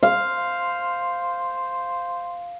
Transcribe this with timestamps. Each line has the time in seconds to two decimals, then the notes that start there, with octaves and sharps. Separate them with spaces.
0.03 C5 F5